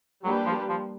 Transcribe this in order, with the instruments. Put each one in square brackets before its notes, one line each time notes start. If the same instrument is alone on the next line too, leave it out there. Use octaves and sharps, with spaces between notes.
[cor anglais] F#3 [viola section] G3 A#3 D4 G4 B4
[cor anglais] F3
F3